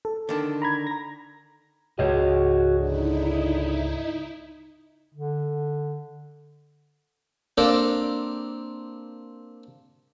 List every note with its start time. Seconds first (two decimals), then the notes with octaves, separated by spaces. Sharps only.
0.05 A4
0.29 D3 D#3 A5
0.62 A#5 B5 G#6
0.87 A#5 A#6
1.99 C#2 G#2 F#4 G#4 C#5 D#5
2.80 D3 D#4 E4
5.14 D3
7.58 A#3 C4 D4 G4 A4 A#4